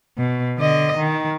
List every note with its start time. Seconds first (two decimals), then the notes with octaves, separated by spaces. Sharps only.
0.18 B2
0.58 D3 D#5
0.97 D#3